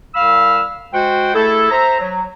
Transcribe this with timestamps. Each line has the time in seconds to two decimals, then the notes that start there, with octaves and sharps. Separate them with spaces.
0.14 C2 F5 B5 E6
0.93 G#3 F#4 C5 F#5 G5
1.35 A3 E4 G#4 A4
1.71 C5 E5 A#5
2.00 F#3